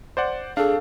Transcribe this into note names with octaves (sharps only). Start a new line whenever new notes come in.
C5 D5 F#5
D4 G#4 A4 F5